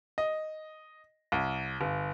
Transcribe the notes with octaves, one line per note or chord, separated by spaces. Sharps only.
D#5
C2
G1